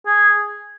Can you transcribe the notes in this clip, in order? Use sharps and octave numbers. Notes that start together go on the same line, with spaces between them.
G#4